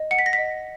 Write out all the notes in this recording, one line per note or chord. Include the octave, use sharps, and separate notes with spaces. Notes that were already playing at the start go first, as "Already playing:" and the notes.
Already playing: D#5
F#5 C#7
B6
A#6
B6
D#5